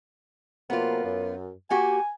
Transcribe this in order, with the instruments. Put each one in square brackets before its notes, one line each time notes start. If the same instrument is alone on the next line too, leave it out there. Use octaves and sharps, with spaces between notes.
[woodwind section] C3 F#3 A#3 [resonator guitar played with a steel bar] B3 F4
[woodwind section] F#2
[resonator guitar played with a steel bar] A#3 F#4 G4 [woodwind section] G#5